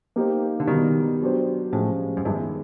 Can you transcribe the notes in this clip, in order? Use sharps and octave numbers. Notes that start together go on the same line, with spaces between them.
A#3 D#4 G4 C5
D3
B2 D#3 G3 B3
F#3 B3 D4 G4 C5
A2 F3 G#3 C#4
F#2
G2 D#3 G#3 B3 E4